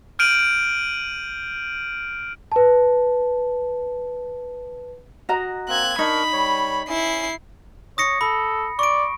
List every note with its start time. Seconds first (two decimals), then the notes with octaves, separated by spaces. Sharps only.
0.19 F6 G6 D7 D#7 F7 F#7
2.52 B4 A5
5.29 F#4 D#5 A#5
5.68 A#3 C4 F#6 G#6
5.99 D4 D#4 A#4 B5 C#6
6.33 G3 C#5
6.88 C#4 E4 C7
7.98 C#5 D#6 A#6 C#7
8.21 A4 B5
8.79 D5 C#6 D7